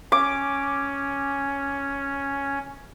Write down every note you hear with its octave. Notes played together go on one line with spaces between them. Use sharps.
C#4 D6